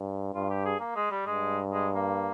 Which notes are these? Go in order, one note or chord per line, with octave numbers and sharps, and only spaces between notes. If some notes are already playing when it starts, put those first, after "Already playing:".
Already playing: G2
G2 F4
G4
G#4
A#3
G#3
G3
G2 G#3
G#3
A#3